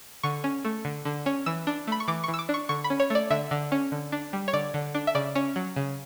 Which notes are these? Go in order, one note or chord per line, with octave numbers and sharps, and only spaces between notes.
D3 C#6
C#4
A3
D3
D3
C#4
E3 E6
D4
A3 B5
C#6
E3 D6
E3 C#6
E6
D6
D4 C#6
D3 C#6
B5
C#4
C#5
A3 D5
D3 E5
D3
C#4
D3
D4
G3
C#5
D3 D5
D3
D4
E5
C#3 D5
C#4
F#3
C#3